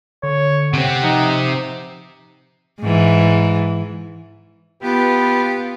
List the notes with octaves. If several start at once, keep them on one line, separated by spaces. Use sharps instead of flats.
D3 C#5
C3 C4 F#5
F3 D#4
G#2 E3
B3 F4 G4 B4